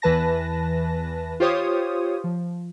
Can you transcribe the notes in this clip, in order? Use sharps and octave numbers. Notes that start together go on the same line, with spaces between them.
E2 E3 B4 A5 A#6
F4 G4 C5 C#5 D#6
F3